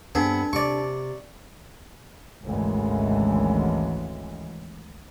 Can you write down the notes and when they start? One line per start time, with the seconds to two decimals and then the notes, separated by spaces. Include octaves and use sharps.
0.15 G2 B3 C4 D4 G#4 A4
0.53 C3 D5 C#6
2.44 G#1 D2 C#3 E3 G#3